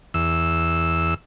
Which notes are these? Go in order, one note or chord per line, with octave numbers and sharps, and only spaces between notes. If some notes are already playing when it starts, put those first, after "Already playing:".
E2 E6